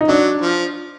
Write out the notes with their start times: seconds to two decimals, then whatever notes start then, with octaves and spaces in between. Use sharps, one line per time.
0.01 D#4
0.08 F#3 D4
0.42 F3